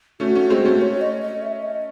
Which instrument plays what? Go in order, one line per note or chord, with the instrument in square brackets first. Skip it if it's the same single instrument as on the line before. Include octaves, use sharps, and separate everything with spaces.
[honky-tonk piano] A3 C#4 [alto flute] F#4
[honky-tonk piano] A3 C#4
[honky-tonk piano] G#3 C4 [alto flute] F#4
[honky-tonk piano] A3 C#4
[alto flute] C#5
D#5
D#5
E5
D#5